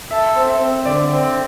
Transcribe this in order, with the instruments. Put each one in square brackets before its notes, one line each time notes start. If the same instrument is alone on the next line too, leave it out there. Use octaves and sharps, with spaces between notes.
[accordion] A4 [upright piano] E5
[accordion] C4
[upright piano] E5
[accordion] C4
[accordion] D3 [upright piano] D5
[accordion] C4